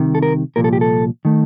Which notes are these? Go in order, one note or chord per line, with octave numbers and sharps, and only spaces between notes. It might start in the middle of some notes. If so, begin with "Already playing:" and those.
Already playing: C2 C3 D#3
A4
A#4
C2 A#2 F3 A#4
A4
G4
A4
D#3 A3